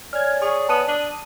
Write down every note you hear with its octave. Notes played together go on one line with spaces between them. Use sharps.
C#5 D5 G#5 F6 G#6
G#4 C#6
B3 A5 D#6 D#7
D4